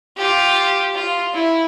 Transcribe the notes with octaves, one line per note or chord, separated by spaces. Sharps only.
F4 G4
F4
E4